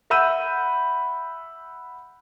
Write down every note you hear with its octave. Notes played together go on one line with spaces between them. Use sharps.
E5 F#5 B5 E6 G6 D#7